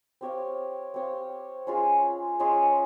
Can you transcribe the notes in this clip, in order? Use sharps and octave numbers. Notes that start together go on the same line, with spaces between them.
C4 G4 C#5 F5
C4 G4 C#5 F5
G#3 C#4 F4 G#4
G#3 C#4 F4 G#4